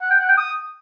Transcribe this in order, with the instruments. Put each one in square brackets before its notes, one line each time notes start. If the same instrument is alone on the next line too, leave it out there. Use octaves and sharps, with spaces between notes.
[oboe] F#5
G5
F#5
G5
D#6